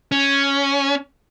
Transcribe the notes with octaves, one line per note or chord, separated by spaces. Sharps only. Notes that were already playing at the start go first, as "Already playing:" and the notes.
C#4